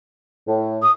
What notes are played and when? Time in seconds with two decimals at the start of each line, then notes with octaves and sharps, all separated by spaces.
0.46 A2
0.83 D#6